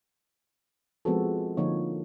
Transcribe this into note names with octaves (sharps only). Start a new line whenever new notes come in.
F3 G#3 B3 C4 F#4 A4
D3 F3 A#3 D#4 C#5